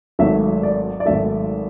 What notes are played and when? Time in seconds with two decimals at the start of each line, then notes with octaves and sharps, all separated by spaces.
0.19 G#1 G#2 F#3 A3 E5
0.63 D5
1.00 D5
1.06 G#1 G#2 F#3 A3 E5